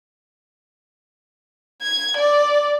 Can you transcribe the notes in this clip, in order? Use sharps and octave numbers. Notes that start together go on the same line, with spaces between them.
G#6
D5